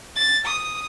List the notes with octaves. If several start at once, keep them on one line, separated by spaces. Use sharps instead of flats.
A6
D#6